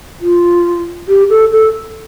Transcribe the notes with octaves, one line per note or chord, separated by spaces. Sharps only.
F4
G4
A4
A4